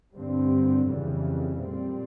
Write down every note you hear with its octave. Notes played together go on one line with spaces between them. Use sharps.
G2 D3 G3 C4
F2 C#3 E3 G3
A#2 G3 C4